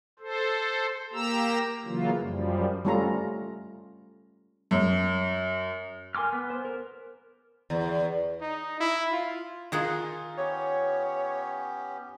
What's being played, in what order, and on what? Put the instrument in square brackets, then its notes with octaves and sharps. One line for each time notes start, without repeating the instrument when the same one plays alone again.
[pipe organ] A4 C5
A#3 G4 A#5 E6
C#3 E3 F#3 A#3 F4
F#2 F3 G3
[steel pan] G3 A3 C#4 F4 A4 A#5
[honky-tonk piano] F#2
[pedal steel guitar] A#4 G#5 C6 D6 F6
B3
C5
A#4
[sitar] E2
[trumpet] D#4
E4
F4
[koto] D#3 G#4 F#5 [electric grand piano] D#4 F4
[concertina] B3 C#4 G4 [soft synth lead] C#5